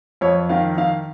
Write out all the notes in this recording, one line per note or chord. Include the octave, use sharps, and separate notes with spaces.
F2 C#5
D#3 F5
D#3 F5